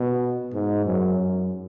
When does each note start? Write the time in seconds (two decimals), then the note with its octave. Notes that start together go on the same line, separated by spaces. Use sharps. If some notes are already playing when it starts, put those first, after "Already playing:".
Already playing: B2
0.53 G#2
0.86 F#2
1.18 F#2